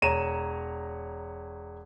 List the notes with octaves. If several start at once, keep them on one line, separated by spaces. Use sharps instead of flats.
E1 C#5 A#5 D#7 E7